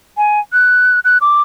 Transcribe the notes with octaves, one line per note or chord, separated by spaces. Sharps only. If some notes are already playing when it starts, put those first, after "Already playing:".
G#5
F#6
F#6
D6